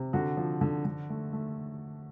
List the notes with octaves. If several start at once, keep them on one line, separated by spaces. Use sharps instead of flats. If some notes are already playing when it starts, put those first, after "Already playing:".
Already playing: C3
D3 F#4
F3
D3
D3
A3
A3